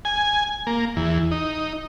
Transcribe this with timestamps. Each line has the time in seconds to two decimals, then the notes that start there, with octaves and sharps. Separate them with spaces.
0.05 G#5
0.67 A#3
0.96 E2
1.31 D#4